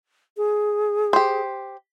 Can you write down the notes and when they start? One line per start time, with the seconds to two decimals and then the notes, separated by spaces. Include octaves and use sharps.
0.37 G#4
1.13 G4 C5